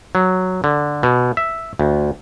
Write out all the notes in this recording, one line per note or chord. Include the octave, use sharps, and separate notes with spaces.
F#3
D3
B2
E5
D2